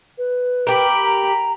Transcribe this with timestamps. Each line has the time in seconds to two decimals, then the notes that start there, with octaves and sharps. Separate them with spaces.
0.18 B4
0.67 G4 A#4 G5 B5
1.04 A#5